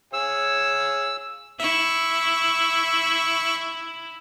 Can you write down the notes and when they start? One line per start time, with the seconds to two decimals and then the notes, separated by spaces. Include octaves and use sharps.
0.13 G#4 C#5 F5 E6
1.60 E4 E5 C#6